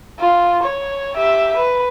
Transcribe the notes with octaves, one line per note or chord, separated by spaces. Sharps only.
F4
C#5
G4 E5
B4